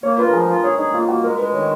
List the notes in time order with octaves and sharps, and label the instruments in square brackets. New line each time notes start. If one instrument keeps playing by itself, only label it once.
[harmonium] A#3 [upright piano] C#5
[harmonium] F4 [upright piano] B4
[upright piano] A#4
[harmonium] F3 [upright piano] G#4
[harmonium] F4
[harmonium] G#4 [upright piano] C#5
[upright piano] D#4 [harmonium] G#4
[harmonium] A#3 [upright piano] F4
[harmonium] A#3 [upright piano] F#4
[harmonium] G#3 [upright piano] A#4
[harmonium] G#3 [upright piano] B4
[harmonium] D#3 [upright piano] C#5